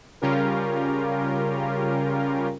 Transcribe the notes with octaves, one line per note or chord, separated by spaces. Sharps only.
C#3 G3 C#4 F4 G4 A#4